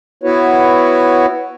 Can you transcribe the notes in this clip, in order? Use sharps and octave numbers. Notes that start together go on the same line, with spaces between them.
B3 E4 F#4 B4 C#5